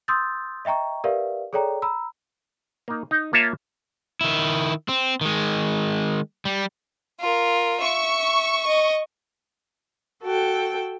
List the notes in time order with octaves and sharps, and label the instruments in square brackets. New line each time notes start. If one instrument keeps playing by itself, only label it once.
[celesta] C6 D#6 E6 G6 A6
D#5 E5 G5 A#5 C#6
G4 A#4 B4 D5 E5 F5
G#4 A4 C#5 D5 G5 A#5
A#5 B5 E6
[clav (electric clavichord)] A#3 D#4
D#4
A#3 F4 C#5 E5 A5
[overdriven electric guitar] D#3 E4
C4
D#3 G#3
G3
[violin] F4 A#4
[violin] E5 [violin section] C#6
[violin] D#5
[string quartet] F#4 A4 G5